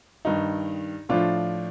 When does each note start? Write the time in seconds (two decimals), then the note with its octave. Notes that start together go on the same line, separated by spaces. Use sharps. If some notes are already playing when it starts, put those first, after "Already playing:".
0.25 G2 D#3 D#4
1.09 A2 F3 D4 F4